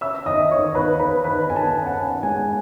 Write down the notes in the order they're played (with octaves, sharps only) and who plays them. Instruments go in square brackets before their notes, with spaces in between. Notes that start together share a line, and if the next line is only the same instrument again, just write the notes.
[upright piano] C#4 E5 E6
D#2 D#5 D#6
D#2 C#5 C#6
D#2 B4 B5
D#2 B4 B5
D#2 B4 B5
D#2 G#5
A5
G#5
C#4
F#5
C#4
G#3 G#5